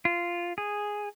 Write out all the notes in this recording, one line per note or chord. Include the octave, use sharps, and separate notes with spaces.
F4
G#4